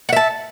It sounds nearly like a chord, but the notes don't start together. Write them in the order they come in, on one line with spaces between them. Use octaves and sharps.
F#5 E5 A5